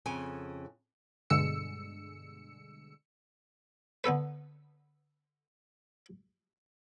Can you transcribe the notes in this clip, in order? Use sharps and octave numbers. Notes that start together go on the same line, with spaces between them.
F2 C#3 G#5
G2 B2 D3 G#3 E6 C#7
D3 B3 A4 B4